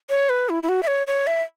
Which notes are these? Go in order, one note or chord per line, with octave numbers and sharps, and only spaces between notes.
C#5
B4
E4
E4
F#4
E5
C#5
C#5
E5